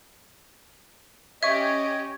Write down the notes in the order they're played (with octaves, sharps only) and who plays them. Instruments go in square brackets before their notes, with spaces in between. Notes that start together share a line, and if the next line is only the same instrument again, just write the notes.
[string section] C#4 G4 [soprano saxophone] D#5 [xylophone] E5 [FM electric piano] C#6 G#6